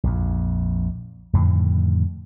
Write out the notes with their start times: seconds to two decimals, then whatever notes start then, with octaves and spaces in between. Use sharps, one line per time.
0.04 A#1 F2
1.33 F2 A2 D3 D#3